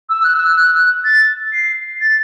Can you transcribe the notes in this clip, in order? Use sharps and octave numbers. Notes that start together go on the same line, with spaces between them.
E6
F#6
E6
F#6
A6
C7
A6